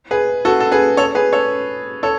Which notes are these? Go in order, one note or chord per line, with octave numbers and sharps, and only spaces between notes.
G#4 B4
F#4 A4
A4
G#4 B4
A4 C#5
G#4 B4
A4 C#5
A4 C#5